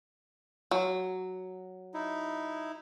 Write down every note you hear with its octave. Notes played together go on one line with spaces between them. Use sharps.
F#3
D#4 E4